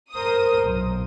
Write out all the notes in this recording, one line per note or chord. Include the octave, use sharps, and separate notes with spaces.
A#4 C5 D#6
B1